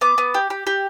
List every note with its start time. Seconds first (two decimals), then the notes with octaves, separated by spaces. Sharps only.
0.01 B3 D6
0.18 B3
0.34 G4
0.50 G4
0.67 G4